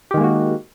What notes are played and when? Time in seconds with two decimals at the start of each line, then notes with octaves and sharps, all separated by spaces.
0.11 G4
0.14 D#3
0.17 G#3
0.21 A#3
0.24 F#4